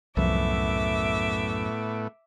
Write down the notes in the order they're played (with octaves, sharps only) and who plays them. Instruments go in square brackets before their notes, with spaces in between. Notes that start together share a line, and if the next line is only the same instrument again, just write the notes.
[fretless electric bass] C2 F3 [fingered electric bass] F#2 [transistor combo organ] A2 A3 B3 [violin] E5 D6